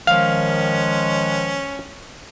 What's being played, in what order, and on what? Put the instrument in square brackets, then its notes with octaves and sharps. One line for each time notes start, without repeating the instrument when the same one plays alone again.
[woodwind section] D#3 F3 G#3 [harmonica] C#4 [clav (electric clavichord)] F5